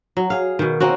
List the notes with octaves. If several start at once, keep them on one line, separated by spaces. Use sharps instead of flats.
F#3
G#4 F5
B2 D#3
A#3 C4 C#4 F#4